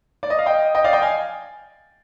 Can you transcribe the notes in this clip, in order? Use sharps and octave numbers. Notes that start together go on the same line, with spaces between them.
D5
D#5
F5
D#5 G5
D#5 G5
D5 F5
D#5 G5
F5 G#5